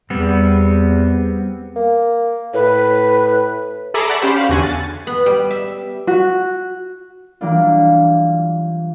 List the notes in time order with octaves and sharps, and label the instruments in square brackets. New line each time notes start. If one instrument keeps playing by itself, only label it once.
[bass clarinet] E2 [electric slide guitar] G3 B3 C4
[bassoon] A#3
[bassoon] A2 [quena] B4
[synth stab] G#4 A4 E5 A#5 B5 D6
D5 F#5 A5 B5 C#6
C#4 G4 C5 B5
F#4 F5
E2 D3 F#4 F#5 G#5
A6
[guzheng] B3
G3
E5
[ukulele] F#4
[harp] E3 F#3 G3 A#3 D4 F4